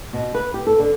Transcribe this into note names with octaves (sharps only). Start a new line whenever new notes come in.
B2
B4
G4
A4
D3